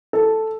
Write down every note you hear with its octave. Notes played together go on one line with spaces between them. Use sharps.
A4